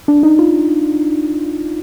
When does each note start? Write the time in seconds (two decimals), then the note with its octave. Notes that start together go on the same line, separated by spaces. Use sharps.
0.08 D4
0.23 D#4
0.39 F4